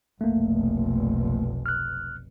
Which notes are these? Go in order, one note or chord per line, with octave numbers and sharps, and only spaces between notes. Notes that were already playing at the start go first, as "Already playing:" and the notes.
F1 B1 A3 A#3
F6 F#6